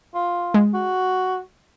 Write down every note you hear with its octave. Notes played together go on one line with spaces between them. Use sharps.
F4
G#3
F#4